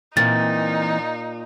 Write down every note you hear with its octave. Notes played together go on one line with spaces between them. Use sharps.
A#2 E3 A#3 C4 D#4 A6